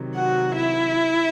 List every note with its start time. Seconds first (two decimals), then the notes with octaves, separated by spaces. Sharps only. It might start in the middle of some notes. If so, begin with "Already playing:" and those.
Already playing: C3 D#3 F#3
0.16 F#4 F#5
0.55 E4 E5